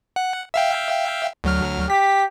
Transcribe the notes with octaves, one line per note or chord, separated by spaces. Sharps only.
F#5
E5 F5 G5
D2 F#3 F6
G4 B6